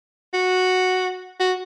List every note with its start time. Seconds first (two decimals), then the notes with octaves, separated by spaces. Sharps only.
0.34 F#4
1.40 F#4